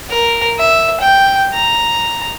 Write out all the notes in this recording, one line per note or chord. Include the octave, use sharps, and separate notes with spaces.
A#4
E5
G5
A#5